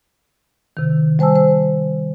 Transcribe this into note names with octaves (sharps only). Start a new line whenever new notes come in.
C3 D#3
G3 C5 G#5 A5 E6
C5